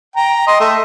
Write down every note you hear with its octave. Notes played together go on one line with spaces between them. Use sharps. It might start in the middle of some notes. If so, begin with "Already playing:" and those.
G5 A#5
D#5 C6
A3 E5